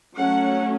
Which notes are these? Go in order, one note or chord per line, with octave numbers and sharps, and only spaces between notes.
F#3 A3 C#4 F#5